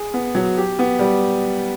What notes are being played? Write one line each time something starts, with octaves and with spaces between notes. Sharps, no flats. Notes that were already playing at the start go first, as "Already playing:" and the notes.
Already playing: G#4
B3
F#3
G4
B3
G3